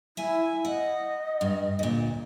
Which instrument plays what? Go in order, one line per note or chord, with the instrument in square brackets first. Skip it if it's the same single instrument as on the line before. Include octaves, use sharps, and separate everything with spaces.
[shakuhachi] E4 [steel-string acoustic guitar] E5 G#5
[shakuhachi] D#5 [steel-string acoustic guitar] F#5
[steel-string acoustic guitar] G2
D2 A#2